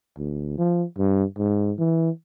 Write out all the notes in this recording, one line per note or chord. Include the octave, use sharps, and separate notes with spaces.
D2
F3
G2
G#2
E3